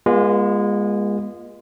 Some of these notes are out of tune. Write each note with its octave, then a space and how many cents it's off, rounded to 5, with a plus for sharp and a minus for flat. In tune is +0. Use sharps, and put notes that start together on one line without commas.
G#3 -20 B3 -45 F4 +0